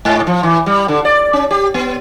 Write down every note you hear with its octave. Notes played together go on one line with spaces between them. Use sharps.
G#2
F3
E3
G3
D3
D5
C#4
G4
B3